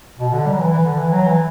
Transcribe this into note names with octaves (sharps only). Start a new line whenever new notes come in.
B2
D3
G3
F#3
E3
E3
D3
E3
F#3
E3